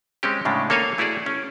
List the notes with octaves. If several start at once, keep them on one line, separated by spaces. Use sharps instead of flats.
G#3 C4 C#4 G4
A2 C#3 G#3 D4
A#3 A4 C#5 F5 G#5
A3 E4 F#4 G#4 D5
C#4